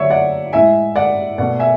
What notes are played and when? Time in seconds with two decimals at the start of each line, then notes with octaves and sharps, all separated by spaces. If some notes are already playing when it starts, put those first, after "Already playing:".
Already playing: D3 F#3 A3 C#5 D5 E5
0.10 D5 F#5
0.53 A2 G#3 E5 G#5
0.96 D5 F#5
1.38 B2 A3 D5 F#5
1.59 E5 G#5